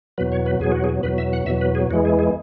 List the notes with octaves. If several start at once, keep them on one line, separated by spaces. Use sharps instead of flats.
E2 B2 F#3 B4
C#5
B4
E2 B2 F#3 G#4
F#4
G#4
E2 B2 F#3 B4
E5
F#5
E2 B2 F#3 E5
B4
G#4
E2 E3 G#3 F#4
G#4
G#4